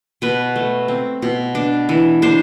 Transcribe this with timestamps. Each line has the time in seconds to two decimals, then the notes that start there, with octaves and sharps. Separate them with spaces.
0.22 B2 B4
0.56 A3
0.88 C4
1.22 B2
1.55 D4
1.89 E3
2.22 D4 C5